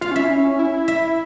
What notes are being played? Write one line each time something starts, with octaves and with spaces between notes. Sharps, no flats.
F4 F5
C#4
E5
E4
C#4
E4
E5